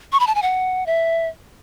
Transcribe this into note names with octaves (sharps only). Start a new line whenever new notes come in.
C#6
B5
A5
G#5
F#5
E5